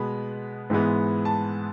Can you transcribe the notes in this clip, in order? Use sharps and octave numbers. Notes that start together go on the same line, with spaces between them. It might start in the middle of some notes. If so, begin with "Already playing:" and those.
Already playing: B2 G#3 B3 B5
G#2 E3 G#3 B3
A5